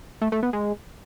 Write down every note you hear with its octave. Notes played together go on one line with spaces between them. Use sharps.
A3
A3
B3
G#3